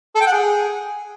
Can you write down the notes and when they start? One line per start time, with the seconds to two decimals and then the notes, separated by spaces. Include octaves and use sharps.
0.15 A4
0.21 G5
0.26 F#5
0.32 G#4